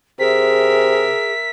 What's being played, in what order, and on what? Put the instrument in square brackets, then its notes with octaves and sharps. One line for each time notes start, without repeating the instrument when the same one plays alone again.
[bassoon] C3 [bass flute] G#4 [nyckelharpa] A#4 E5 [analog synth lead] B6